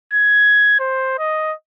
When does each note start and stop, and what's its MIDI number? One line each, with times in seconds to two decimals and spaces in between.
0.14 0.75 92
0.80 1.17 72
1.19 1.54 75